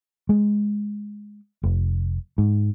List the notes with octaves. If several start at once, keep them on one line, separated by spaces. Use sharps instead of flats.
G#3
F1
G#2